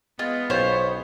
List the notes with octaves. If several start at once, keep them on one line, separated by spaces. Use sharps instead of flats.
G#3 B3 F4
B1 C#4 F4 C5 C#5 G5